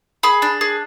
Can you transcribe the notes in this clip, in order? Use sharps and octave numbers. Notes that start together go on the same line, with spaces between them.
G#4 B5
D4
G#4